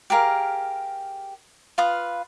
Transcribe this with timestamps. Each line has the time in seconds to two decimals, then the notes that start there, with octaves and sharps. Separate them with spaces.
0.10 G4 G#4 A#4 F5
1.78 F4 B4 F5 D#6